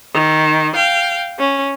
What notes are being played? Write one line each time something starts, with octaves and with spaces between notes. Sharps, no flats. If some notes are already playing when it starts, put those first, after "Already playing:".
D#3
F5 G5
C#4